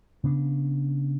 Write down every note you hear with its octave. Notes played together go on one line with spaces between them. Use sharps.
C#3 B3 D4